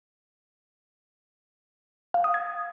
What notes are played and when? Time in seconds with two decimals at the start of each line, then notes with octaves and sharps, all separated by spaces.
2.14 F5
2.24 D#6
2.34 G#6